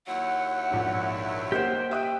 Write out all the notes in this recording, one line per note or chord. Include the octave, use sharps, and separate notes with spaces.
D#2 F#3 E4 F#5
A#1 G#2
A#3 D#4 G4 C5 F#5 G5
E5 G5 D#6 F#6